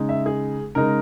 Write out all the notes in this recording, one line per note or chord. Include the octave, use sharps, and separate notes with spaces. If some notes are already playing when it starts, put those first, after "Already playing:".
Already playing: C#3 G#3 D#4
E5
G#4
C#3 G#3 D#4 A#4